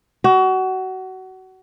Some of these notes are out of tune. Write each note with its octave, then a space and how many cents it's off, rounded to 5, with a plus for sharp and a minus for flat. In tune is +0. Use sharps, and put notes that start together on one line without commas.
F#4 +25